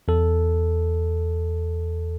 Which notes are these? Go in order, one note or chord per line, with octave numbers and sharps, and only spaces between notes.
E2 A4